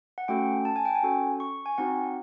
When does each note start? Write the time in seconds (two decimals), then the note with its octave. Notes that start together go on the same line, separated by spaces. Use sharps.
0.18 F#5
0.28 A3 C#4 F#4 A4 G5
0.65 A5
0.76 G#5
0.85 G5
0.95 G#5
1.03 C#4 F#4 A4
1.40 C#6
1.66 G#5
1.78 C4 D#4 F#4 F#5